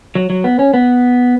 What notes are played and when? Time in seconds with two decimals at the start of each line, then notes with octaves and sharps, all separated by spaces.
0.15 F#3
0.30 F#3
0.44 B3
0.59 C#4
0.74 B3